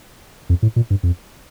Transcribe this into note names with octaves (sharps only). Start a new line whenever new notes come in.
F2
A2
A#2
G2
F2